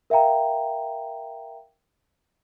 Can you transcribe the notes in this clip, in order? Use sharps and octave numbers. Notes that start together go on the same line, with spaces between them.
A#4 E5 F5 G5 A#5